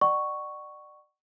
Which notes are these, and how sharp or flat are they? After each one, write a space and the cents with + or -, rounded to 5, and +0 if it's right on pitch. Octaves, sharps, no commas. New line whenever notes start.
D5 +35 F#5 +40 C#6 +0